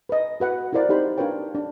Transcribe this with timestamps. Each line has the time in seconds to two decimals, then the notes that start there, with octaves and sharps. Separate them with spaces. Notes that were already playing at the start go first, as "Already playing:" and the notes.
0.09 B4 D#5
0.40 F#4 B4 F#5
0.73 E4 F4 A#4 C5 D5
0.89 D#4 G4 C5 B5
1.18 D4 F4 A#4 B4 C#5 G5
1.55 D4